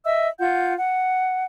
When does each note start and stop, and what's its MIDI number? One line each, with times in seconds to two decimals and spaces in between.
0.05 0.27 75
0.05 0.27 76
0.05 0.27 88
0.39 0.74 65
0.39 0.74 78
0.39 0.74 91
0.77 1.45 78